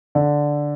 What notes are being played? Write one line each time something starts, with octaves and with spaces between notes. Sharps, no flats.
D3